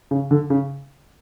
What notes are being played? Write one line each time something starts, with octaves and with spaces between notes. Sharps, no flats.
C#3
D3
C#3